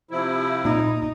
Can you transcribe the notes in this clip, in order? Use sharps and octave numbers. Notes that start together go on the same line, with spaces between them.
C3 F3 E4
A#2 D#4